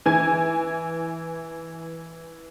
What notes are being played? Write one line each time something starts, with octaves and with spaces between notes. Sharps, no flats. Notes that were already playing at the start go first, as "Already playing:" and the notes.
E3 G#5 G#6